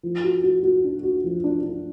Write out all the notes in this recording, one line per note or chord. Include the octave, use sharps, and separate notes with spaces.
F3
F#4
F#4
F#4
D4
F#4
F3
D4
D4